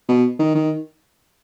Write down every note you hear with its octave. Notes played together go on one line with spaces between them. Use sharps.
B2
D#3
D#3